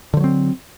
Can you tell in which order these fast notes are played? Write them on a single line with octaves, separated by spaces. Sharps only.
D3 F3 F#3 C4